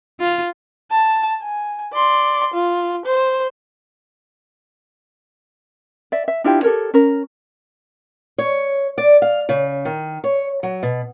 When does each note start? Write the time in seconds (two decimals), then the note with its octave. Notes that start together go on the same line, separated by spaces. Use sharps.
0.20 F4
0.91 A5
1.42 G#5
1.93 D5 C6
2.54 F4
3.06 C5
6.12 D5 E5
6.28 E5
6.44 D4 E4 F4 G4
6.63 G4 A4 A#4 C#5
6.94 C#4 A#4
8.38 C#5
8.98 D5
9.22 F5
9.49 C#3
9.85 D#3
10.24 C#5
10.63 F#3
10.83 B2